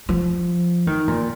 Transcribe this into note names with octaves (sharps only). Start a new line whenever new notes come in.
F3
D#3
A#2